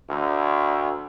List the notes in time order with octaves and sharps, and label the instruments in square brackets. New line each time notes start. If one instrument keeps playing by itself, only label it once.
[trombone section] D2